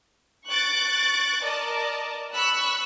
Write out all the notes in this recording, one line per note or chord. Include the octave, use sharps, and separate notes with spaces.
C#6 F#6 A6 D7
A#4 D5 D#5 A5
B5 C#6 E6 F#6